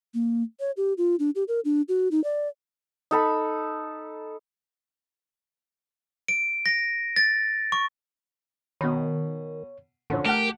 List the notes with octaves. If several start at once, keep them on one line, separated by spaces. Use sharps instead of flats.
A#3
C#5
G4
F4
D4
G4
A#4
D4
F#4
D#4
D5
D#4 A4 B5
D7
A#6
A6
C#6
B2 D#3 C#5 B5
A2 D3 F3 C#4
A3 G4 A#4 F#5 A5